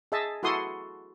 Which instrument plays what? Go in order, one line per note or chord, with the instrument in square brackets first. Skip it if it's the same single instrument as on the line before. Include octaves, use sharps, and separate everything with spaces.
[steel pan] G#4 D#5 E5 A5
E4 F#4 A4 C6 D#6